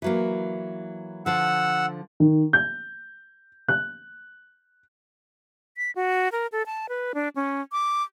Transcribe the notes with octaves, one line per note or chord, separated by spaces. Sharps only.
E3 F#3 A#3
D3 F3 F#5 E6
D#3
G6
F#6
B6
F#4
A#4
A4
A5
B4
D4
C#4
D6